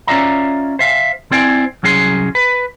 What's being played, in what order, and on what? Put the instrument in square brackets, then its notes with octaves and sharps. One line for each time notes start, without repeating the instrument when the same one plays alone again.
[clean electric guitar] C#4 F4 D5 E5 A#5
C5 E5 F5
C4 E4 C5 D5 G5 G#5
C2 F#3 C#4 G#4 F#5 C6
B4